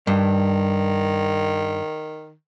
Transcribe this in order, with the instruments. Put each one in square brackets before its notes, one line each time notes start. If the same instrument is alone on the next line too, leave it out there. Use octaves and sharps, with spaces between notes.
[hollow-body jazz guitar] G2 [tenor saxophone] D#3